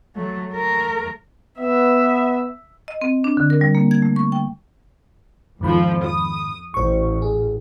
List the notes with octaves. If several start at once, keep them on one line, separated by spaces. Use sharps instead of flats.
F#3 A3
A3 A#4
B3 E5
D#5
C4
D4
D3
A#4
G3
A#3
G#6
A3
C#6
G5
F2 G#2 D#3 F3 B5
D#6
A1 C5 C#6
G#4